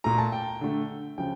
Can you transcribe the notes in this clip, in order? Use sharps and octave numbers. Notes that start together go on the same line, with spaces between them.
A#2 A3 A#5
A5
G5
D3 A3
C#3 F3 G5